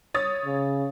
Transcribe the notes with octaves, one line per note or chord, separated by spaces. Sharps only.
C#5 D#6 A6
C#3